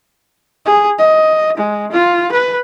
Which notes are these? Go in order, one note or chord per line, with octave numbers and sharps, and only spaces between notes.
G#4
D#5
G#3
F4
B4